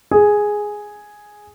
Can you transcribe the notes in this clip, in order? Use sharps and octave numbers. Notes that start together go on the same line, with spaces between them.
G#4